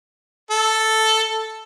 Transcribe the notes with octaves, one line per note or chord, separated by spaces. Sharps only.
A4